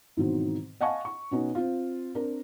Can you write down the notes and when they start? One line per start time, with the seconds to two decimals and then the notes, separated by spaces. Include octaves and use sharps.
0.17 G#2 B2 D#3 E3 F#3 C4
0.81 D#5 F5 F#5 G#5 A5 C#6
1.05 C#6
1.31 B2 B3 C#4 D#4
1.55 C4 F4
2.15 C4 D4 A#4